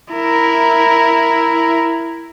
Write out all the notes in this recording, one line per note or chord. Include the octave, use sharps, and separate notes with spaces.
E4 A#4